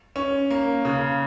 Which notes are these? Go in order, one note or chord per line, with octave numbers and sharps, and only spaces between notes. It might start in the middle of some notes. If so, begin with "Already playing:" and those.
C#4
A#3
C#3